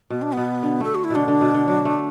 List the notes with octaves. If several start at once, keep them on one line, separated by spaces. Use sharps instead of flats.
B2 B3
D4
B2 B3
D3
A3 A4
F#4
E4
B2 D3 D4
D3
B2
D3
F#3
A3